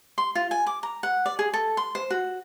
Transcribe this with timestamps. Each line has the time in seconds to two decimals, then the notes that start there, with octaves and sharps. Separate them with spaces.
0.18 C6
0.35 F4
0.51 G#5
0.67 D6
0.83 A#5
1.03 F#5
1.26 D5
1.39 G#4
1.53 A4
1.77 C6
1.95 C5
2.10 F#4